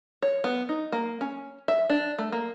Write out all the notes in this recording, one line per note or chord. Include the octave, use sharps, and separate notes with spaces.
C#5
B3
D#4
A#3
C#4
E5
D4
A3
A#3